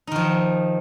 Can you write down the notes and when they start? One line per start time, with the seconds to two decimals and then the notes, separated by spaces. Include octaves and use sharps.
0.07 D#4
0.12 D#3
0.16 F3